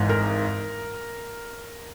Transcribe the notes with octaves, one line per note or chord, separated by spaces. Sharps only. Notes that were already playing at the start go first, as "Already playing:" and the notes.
Already playing: G#1 G#2 E3
A#4